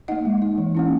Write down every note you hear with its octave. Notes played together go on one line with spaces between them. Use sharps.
A#3 D#4 D#5 F#5
G#3
D#4
E3
A#3 C#4 E4